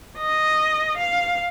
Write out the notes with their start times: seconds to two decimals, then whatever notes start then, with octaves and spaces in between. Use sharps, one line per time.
0.17 D#5
0.97 F5